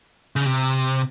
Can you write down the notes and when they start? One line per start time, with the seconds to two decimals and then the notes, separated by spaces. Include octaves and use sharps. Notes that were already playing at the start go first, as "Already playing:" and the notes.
0.36 C#3
0.46 C3